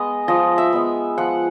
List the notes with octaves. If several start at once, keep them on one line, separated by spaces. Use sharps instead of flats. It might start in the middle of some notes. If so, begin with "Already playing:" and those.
Already playing: G#3 B3 D#5
F3 D#5
E5
G#3 B3
F3 F#5